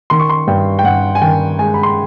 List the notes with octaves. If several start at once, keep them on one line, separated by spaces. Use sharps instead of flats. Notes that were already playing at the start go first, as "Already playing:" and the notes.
D#3 C6
C#6
C6
G2 G5
G5
G2 F#5
G#5
D#3 G5
G#3 G#5
B5
C6